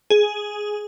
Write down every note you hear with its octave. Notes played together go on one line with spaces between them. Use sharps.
G#4